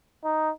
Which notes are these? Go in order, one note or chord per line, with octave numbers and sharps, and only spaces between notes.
D#4